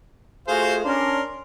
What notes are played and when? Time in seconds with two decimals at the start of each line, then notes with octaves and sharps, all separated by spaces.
0.48 A3 F4 F#4 G#4 C5 F5
0.84 C#4 D4 A#4 C6